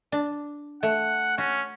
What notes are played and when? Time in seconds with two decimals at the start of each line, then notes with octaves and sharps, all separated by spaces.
0.12 D4
0.83 A3 F#5
1.38 C#4 F#4